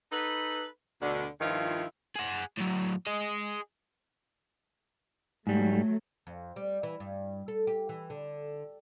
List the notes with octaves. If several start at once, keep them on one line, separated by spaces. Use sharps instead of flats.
D#4 A4 B4
D2 B2 D3
G2 D#3 F3 E4 F4
G#4 F#5
A2 F#3
G#4 D#5
G#2 F#3 G3 A3
F2
G3
E3
G2
A4
G4
E3
D3